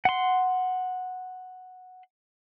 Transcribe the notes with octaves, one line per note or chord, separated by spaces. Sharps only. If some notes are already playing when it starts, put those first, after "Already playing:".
F#5 C6